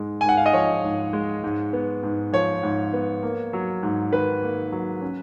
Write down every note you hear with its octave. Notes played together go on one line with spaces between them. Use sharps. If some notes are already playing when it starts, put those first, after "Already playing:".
Already playing: G#2 G#3
G#2 G#5
F#5
F5
D#5
F3 C#5
G#2
G#3
G#2
B3
G#2
F3 C#5
G#2
B3
A#3
F#3
G#2
D#3 B4
A#3
F#3
C#4